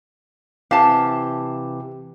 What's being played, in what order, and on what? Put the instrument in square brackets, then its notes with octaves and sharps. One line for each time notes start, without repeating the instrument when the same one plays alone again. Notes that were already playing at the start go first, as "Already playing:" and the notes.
[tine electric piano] C3 E3 G4 [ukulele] F5 A5